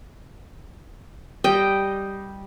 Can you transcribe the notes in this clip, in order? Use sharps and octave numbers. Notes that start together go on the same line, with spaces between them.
G3 D#5 G5